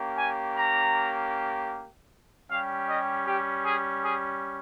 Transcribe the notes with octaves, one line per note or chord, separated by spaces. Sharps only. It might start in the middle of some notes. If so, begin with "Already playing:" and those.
Already playing: A#3 C#4 G4
G#5
A#5
G3 C#4 G4 F5
D#5
G4
G#4
G#4